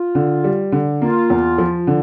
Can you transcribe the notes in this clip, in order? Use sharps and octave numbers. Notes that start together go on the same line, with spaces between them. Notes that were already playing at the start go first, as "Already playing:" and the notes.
Already playing: F4
D3
G3
D3
A#3 F4
E2
F3
D3